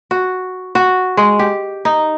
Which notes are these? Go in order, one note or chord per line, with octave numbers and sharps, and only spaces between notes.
F#4
F#4
G#3
G4
D#4